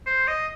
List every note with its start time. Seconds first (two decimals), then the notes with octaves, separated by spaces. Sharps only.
0.06 C5
0.28 D#5